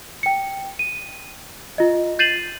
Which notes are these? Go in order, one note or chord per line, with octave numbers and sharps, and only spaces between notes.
G5 C#7
D#7
F4 D#5
G6 A6 C7 D#7 E7 F#7